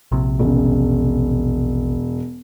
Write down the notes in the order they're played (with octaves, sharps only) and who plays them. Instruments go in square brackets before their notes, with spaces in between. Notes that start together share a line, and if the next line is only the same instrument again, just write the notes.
[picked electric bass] A#1 C3
[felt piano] E1 C#3